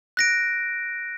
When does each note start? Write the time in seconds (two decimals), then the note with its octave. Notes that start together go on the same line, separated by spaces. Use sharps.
0.17 F#6 A#6 D7